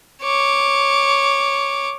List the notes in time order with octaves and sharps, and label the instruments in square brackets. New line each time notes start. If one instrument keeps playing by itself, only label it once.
[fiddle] C#5 D6